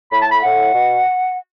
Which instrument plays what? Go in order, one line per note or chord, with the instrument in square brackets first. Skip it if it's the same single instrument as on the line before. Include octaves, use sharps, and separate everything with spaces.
[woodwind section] A2 B5
A5
B5
A2 F#5
B2